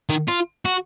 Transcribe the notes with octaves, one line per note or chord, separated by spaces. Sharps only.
D#3
F4
F#4